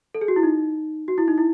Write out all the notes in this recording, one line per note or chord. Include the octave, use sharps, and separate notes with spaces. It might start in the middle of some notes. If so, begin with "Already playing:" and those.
A4
G#4
F#4
E4
D#4
F#4
E4
D#4
E4